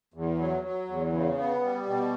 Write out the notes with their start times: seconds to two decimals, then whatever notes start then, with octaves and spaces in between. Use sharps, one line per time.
0.14 E2
0.39 F#3
0.63 F#3
0.88 E2
1.12 C#3
1.37 B3
1.62 G3
1.86 B2